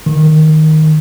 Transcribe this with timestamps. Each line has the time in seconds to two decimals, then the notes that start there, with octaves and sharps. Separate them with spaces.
0.06 D#3